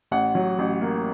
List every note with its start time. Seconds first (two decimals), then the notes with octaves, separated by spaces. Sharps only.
0.11 A1 F#5
0.35 F#3
0.59 A1
0.82 A#3